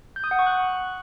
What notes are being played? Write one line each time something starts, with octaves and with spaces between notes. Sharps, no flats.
G6
D#6
F#5
C#6
F#6